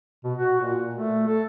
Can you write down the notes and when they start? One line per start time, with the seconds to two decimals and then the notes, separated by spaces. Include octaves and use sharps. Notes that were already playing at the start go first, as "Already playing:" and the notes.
0.24 B2
0.38 F#4
0.61 A#2
0.94 A3
1.28 A4